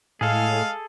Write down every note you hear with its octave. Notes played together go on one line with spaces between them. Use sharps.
A2 G#3 G#4 A4 F5